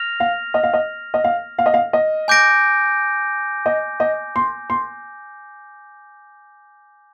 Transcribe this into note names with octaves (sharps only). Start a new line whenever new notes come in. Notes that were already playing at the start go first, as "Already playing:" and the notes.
Already playing: F6 A#6 F7
F5
D#5
F5
D#5
D#5
F5
F5
D#5
F5
D#5
G#5 D6 G6 A#6 D7
D#5
D#5
C6
C6